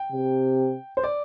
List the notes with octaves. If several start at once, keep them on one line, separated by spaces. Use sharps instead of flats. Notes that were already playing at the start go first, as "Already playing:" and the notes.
Already playing: G5
C3
C5
D5